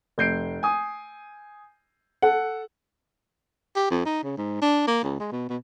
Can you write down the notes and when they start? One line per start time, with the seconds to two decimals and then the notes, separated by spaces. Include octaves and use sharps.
0.18 F1 G6 C7 D7
0.63 G#5 D#6
2.22 A4 F#5
3.76 G4
3.90 F2
4.05 D#4
4.23 C#3
4.38 G#2
4.62 D4
4.87 A#3
5.03 C#2
5.20 G#3
5.32 B2
5.49 B2